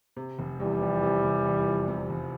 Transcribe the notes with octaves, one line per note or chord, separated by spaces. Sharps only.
C3
F1
E2 E3 G3
F3
C3
F1
E2
F3
C3
F1